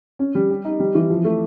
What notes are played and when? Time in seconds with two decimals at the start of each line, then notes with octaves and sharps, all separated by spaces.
0.19 C#4
0.35 G3
0.50 G4
0.65 D#4
0.80 G3
0.95 E3
1.10 F3
1.24 A3